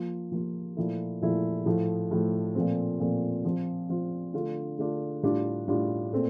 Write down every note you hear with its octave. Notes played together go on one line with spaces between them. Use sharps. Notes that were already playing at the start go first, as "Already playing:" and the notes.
Already playing: F3 A#3 F4
F3 A#3 F4
A#2 F3 A3 E4
A#2 F3 A3 E4
A2 F3 A3
A2 F3 A3
A#2 F3 A3 C4
A#2 F3 A3 C4
F3 C4 F4
F3 C4 F4
D3 A3 D4 F4
D3 A3 D4 F4
A2 G3 D4 F4
A2 G3 D4 F4
A#2 A3 C4